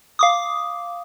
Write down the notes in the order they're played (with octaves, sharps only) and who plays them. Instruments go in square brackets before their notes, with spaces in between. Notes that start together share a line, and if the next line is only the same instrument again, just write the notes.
[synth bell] F5 D6 D#6